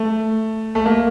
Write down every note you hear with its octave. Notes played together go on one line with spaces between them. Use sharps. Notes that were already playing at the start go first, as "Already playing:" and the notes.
Already playing: A3
A3
A#3